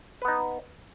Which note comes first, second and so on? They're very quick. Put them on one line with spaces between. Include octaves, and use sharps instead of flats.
B4 B3 D#4